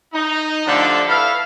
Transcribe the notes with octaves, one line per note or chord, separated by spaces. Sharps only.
D#4
D3 F3 A3 D4 G4 A4
E4 A4 B4 F5